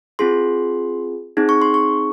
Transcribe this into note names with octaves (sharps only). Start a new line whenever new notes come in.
C4 F4 G#4 C6
C4 D#4 G#4
C#6
C6
C#6